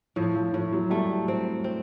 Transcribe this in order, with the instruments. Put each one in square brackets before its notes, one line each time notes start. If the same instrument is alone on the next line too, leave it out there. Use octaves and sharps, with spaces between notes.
[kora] A2 [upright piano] F3
[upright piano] F3
[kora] A2 [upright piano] F3
[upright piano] F#3
[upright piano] G3 [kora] A3
[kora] C4
C4